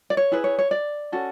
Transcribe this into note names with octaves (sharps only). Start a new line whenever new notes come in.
D5
C#5
E4 G#4 B4
C#5
C#5
D5
C#4 F#4 A4